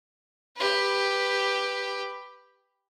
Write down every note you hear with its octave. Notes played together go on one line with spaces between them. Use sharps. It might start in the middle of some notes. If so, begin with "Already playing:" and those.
G4 B4